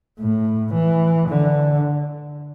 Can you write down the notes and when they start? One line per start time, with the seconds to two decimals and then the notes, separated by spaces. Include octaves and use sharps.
0.20 A2
0.74 E3
1.29 D3